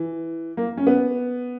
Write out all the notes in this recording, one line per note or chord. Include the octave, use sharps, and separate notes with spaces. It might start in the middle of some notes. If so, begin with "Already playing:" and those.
Already playing: E3
A#3
C#4
B3